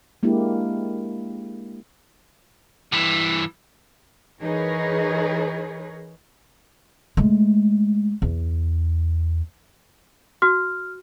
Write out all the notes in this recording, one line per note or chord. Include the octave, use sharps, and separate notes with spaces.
G#3 A#3 D4 E4 G4
G2 E3
E3 D#4 G#4 A#4 B4 C#5
G#3 A3
E2
F#4 F6